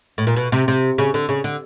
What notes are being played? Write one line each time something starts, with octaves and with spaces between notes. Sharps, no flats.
A2
A#2
B2
C3
C3
C#3
D3
C#3
D3